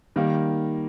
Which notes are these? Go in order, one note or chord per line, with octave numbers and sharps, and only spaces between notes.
D#3 G3 A#3